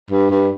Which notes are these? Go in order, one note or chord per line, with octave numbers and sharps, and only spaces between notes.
G2
G2